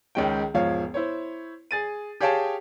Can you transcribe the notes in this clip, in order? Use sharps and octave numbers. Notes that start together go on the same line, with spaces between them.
C#2 D#3 G#3 C#4 G5
E1 G#2 F3 C#5 F5
E4 C5 C#5
G#4 A6 D#7
G4 G#4 C#5 F5 G5 A5